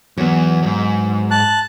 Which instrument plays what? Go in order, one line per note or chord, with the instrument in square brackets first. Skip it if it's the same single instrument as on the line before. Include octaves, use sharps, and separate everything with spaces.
[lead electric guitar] E2 [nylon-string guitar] F#3 B3
[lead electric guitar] F2 G#2
[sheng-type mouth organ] A5 F#6